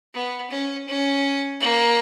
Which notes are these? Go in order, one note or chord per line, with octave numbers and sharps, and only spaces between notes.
B3
C#4
C#4
A#3